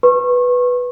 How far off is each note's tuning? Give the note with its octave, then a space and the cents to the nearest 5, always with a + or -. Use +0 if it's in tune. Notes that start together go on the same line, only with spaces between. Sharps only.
B4 +0 C#6 -30